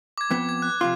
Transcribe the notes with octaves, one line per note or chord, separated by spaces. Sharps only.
D6 G#6
F2 B3
G#6
F#6
F2 C3 F4